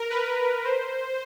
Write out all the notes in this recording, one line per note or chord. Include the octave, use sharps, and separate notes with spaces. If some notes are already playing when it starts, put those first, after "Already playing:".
Already playing: A#4
B4
C5